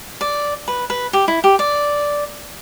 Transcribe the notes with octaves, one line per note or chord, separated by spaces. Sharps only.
D5
B4
B4
G4
E4
G4
D5